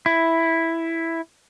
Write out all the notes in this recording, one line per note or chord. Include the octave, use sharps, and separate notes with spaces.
E4